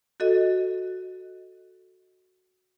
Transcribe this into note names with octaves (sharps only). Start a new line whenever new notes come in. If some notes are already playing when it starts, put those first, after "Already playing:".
F#4 A4 D#5